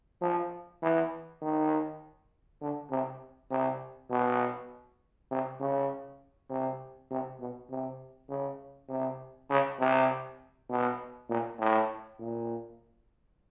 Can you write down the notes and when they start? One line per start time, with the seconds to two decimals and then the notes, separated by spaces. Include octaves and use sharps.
0.22 F3
0.82 E3
1.42 D#3
2.62 D3
2.91 C3
3.51 C3
4.10 B2
5.31 C3
5.60 C#3
6.50 C3
7.11 C3
7.40 B2
7.70 C3
8.30 C#3
8.89 C3
9.50 C#3
9.80 C3
10.70 B2
11.29 A#2
11.59 A2
12.19 A#2